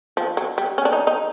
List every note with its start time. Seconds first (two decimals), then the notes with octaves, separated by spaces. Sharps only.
0.17 F3
0.37 F#3
0.58 G3
0.78 C#4
0.85 D4
0.93 D#4
1.07 D#4